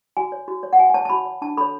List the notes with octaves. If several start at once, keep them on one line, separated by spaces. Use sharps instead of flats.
F#4 G#5
C#5
F#4
C#5
F#5
F#4 G#5
G#5
C#5 A5
A5
F#4 B5
C#5
D4 A5
A4 C#5 B5